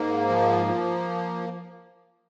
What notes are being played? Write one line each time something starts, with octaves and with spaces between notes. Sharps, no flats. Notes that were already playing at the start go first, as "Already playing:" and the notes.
Already playing: G#2 A#3
F3
F3